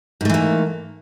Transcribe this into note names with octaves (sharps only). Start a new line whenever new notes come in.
G#2 E3 A3 A#3